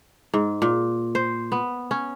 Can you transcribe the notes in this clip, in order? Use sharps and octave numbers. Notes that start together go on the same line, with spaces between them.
G#2
A#2
C5
B3
C#4